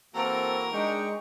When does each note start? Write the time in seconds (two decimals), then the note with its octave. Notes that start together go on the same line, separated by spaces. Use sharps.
0.15 E3 A#3 C4 F#4 A4 A#4
0.73 G#3 D4 D#4 G5 C#6